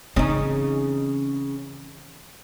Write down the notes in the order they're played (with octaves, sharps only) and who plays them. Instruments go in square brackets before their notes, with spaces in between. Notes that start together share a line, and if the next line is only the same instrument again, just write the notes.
[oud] C#3 D#4 [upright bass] E3 C4